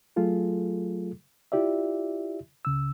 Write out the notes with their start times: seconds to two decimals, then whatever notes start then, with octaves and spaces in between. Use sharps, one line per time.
0.16 F#3 A3 F4 G#4 A4
1.52 E4 F4 G4 D5 E5
2.65 C#2 C#3 E6